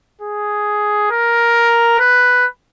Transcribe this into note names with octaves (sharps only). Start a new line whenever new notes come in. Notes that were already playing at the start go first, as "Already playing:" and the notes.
G#4
A#4
B4